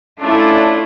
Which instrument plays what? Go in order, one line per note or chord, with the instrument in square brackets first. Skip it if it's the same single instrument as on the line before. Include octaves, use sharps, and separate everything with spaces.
[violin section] A3 [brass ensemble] C#4 D4 [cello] E4 F4